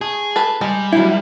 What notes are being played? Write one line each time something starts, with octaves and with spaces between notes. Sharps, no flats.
A3 G#4
A4 B4
G3 G#3
F#3 E4